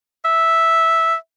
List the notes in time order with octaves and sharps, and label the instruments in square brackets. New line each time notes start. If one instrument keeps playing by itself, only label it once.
[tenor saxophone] E5